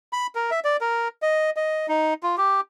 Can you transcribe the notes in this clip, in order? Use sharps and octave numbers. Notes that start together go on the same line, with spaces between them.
B5
A#4
E5
D5
A#4
D#5
D#5
D#4
F4
G4